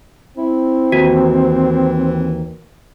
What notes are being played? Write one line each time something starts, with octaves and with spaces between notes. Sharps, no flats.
C4 E4
D#2 E3 F#4